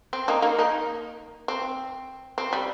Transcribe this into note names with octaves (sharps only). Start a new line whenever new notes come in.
C4
A#3 D#4
A#3 D#4
A#3 D#4
C4
C4
G3